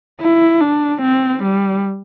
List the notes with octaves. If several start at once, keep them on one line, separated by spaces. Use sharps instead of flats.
E4
D4
C4
G3